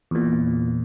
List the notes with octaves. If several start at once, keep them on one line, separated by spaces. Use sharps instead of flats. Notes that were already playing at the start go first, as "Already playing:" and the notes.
E2 A#2